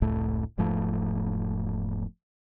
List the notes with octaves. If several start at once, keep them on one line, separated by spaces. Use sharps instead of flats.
F1 C#2 A2 A3
E1 G#2 F3 A3